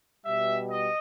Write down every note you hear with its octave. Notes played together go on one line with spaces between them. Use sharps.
B2 G3 E5
D#5